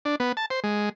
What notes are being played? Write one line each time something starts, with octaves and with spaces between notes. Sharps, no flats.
D4
B3
A5
C5
G#3